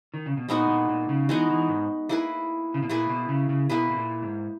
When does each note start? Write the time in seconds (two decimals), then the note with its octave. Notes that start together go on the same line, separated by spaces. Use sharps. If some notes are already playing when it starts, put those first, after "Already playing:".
0.14 D#3
0.26 C#3
0.37 B2
0.49 A#2 G#3 B3 D#4 F#4
0.69 A#2
0.89 A#2
1.09 C#3
1.29 E3 G#3 B3 D#4 F#4
1.50 E3
1.68 G#2
2.09 A#3 E4 G#4 B4
2.74 C#3
2.82 B2
2.89 A#2 A#3 E4 G#4 B4
3.09 B2
3.29 C#3
3.49 C#3
3.69 B2 A#3 E4 G#4 B4
3.91 B2
3.97 A#2
4.22 G#2